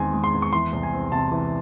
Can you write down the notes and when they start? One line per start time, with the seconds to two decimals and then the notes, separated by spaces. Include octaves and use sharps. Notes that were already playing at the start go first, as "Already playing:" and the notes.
Already playing: E2 D#3 G#3 C4 G#5 C6
0.13 G#3
0.24 C6
0.34 E2
0.42 C#6
0.53 E3 C6
0.73 C2
0.83 G#5
0.93 C4
1.12 C3 A5
1.32 E3